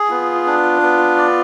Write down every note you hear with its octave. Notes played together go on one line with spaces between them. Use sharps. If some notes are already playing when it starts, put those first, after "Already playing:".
Already playing: G#4
B3 F4
D4
B3
D5